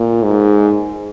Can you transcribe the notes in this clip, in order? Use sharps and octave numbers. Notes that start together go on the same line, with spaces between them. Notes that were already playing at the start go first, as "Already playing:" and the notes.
Already playing: A#2
G#2